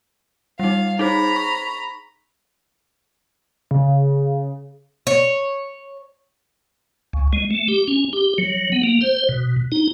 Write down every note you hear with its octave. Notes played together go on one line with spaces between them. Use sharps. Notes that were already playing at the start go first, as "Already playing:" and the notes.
G3 D#4 F5
D#4 G#4 C5 A#5 B5
C#6
C#3
C#5
C#2
G#3
A3
G4
C#4
G4
F#3
B3
A#3
C5
B2
D#4